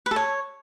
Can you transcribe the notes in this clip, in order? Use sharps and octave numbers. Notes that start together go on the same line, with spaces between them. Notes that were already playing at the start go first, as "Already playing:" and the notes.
B4
A4
C#5